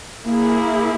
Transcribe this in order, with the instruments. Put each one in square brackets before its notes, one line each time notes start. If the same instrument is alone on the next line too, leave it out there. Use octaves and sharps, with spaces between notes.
[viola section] A#3 E4 G#4